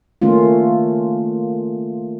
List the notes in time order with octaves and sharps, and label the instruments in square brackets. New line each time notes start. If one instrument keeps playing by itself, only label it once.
[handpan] D#3 A3 A#3 C#4 F4